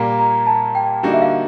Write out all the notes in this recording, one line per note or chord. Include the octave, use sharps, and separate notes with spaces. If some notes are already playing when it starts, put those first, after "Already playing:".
Already playing: A#2 G3 A#3 A#5
A#5
A5
G5
D3 G3 A#3 D#4 F#4
E5
F5